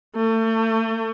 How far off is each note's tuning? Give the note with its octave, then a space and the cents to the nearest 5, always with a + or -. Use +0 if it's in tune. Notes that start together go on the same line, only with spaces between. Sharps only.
A3 +35